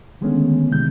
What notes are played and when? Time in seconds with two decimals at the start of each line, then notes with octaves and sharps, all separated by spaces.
0.21 D3 D#3 G#3 A3 B3 C#4
0.71 C#2 C3 D#3 G3 G6